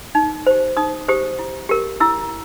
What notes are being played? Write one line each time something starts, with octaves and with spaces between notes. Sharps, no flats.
D#4
G4 C5
D#4 D#6
G4 C5 D#6
E4
G4 A#4
E4 E6